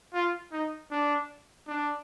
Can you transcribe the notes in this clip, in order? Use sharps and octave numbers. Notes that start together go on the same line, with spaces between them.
F4
D#4
D4
D4